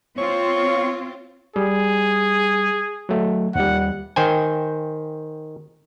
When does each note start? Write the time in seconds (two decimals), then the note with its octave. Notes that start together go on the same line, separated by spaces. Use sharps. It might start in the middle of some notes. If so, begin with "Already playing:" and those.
0.18 C4 F4 C#5
1.56 G3 G#4
3.09 F#3 A3
3.55 D#2 G3 F#5
4.16 D#3 C5 G5 G#5